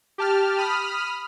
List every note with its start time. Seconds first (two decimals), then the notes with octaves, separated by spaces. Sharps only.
0.18 G4 A5 F6
0.58 B5 D#6 F6